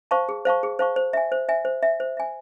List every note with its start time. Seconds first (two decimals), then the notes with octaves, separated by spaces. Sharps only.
0.11 C5 F5 A5 C#6
0.29 G#4
0.45 C5 F5 A5 C#6
0.63 G#4
0.79 C5 F5 A5 C#6
0.96 C5
1.13 E5 G#5
1.32 C5
1.49 E5 G#5
1.65 C5
1.83 E5 G#5
2.00 C5
2.17 E5 G#5